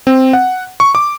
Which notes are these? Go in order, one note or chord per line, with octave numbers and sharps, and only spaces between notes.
C4
F#5
C#6
D6